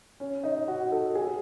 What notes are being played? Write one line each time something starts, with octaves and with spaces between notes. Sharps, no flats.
C#4
D#4
F#4
A4
G#4